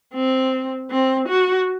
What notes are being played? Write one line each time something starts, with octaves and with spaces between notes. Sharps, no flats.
C4
C4
F#4